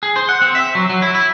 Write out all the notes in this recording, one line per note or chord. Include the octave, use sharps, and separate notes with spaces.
G#4
C5
F#5
C4
E5
F#3
F#3
E4
E4